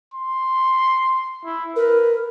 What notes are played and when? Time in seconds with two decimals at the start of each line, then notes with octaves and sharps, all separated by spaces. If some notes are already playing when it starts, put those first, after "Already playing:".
0.14 C6
1.44 E4
1.76 A#4 B4